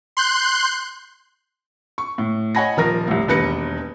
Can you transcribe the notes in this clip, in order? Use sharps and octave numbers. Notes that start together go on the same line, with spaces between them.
C6 F#6 G6
C#6
A2
C#5 D#5 F#5 G#5 B5 A#6
D#1 F3 A#4 A#6
C2 A2
E1 D#2 B4 A#6 C#7